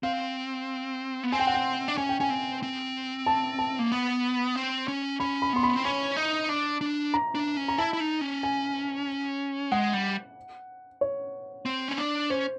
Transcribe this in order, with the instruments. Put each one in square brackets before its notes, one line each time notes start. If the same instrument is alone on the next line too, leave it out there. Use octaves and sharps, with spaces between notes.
[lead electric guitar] C4 [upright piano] F5
[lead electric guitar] B3
[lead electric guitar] C4 [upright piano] G#5
[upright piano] G5
F#5
G5
[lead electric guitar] D4
[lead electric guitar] C#4 [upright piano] G#5
[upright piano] G5
[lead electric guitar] C#4 [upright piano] G#5
[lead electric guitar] C4
C4
[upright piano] A5
A5
[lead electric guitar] A#3
B3
C4
C#4
[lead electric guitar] C#4 [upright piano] B5
[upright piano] B5
[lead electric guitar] B3 [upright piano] C6
[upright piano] B5
[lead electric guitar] C4
[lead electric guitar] C#4 [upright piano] B5
[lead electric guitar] D#4
D4
D4
[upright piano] A#5
[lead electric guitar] D4
C#4
[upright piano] A#5
[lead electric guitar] E4 [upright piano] A5
[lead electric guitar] E4
D#4
C#4
[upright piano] G#5
[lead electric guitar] G#3 [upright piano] F#5
[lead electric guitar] G3
[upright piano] C#5
[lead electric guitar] C4
C#4
D4
[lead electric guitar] C#4 [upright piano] C5